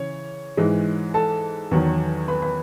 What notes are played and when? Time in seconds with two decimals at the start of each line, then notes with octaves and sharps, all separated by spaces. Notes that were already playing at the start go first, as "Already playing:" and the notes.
Already playing: C#3 E3 C#5
0.57 G#2 E3 G#3
1.14 A4 A5
1.71 E2 D#3 F#3
2.28 B4 B5
2.42 B4 B5